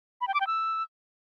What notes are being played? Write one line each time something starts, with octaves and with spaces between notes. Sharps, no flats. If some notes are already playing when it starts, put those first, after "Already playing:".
B5
G5
D6
G5
E6